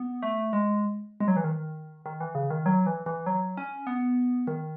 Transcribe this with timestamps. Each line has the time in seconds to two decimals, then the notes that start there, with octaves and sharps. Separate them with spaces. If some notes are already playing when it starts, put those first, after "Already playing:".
Already playing: B3
0.23 A3
0.53 G#3
1.20 G#3
1.28 F#3
1.36 E3
1.44 D#3
2.06 D#3
2.20 E3
2.35 C#3
2.50 D#3
2.66 F#3
2.86 E3
3.06 E3
3.26 F#3
3.57 C#4
3.87 B3
4.47 D#3